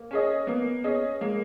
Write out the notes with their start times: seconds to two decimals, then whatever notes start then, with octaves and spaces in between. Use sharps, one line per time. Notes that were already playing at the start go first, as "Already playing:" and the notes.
Already playing: A#3
0.11 C#4 G#4 D#5
0.47 A#3 B3
0.84 C#4 G#4 D#5
1.21 G#3 A#3